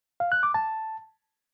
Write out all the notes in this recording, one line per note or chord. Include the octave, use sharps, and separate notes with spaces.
F5
F#6
D6
A5